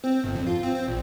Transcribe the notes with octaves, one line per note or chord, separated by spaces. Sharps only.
C4
G1
F2
F4
C4
C4
A#1